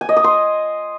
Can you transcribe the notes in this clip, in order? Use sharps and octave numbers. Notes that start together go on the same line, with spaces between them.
G#5
D#5
D#6
C6